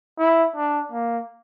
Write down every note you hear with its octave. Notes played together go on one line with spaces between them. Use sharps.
E4
D4
A#3